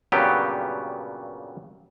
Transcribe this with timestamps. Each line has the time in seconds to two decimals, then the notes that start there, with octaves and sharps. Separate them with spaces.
0.12 G2 A#2 C#3 F#3 B3 G4